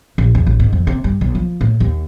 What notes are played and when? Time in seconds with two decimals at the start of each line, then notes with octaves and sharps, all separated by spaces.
0.18 A#1
0.35 E2
0.46 A1
0.60 G#2
0.73 F2
0.87 C3
1.04 G2
1.21 B1
1.35 F3
1.61 A2
1.80 D#2